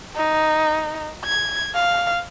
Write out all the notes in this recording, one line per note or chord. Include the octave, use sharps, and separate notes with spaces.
D#4
G#6
F5